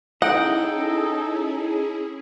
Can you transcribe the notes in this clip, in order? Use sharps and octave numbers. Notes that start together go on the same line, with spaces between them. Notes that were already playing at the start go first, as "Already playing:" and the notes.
C#4 D#4 E4 G#4 A4 D#5 F#5 G5